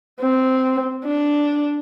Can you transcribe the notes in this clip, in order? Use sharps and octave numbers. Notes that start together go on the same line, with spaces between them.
C4
D4